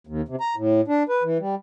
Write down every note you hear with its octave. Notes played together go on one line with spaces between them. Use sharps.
D#2
C3
A#5
A2
D4
B4
E3
G3